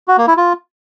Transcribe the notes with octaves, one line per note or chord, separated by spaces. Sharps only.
F#4
A#3
E4
F4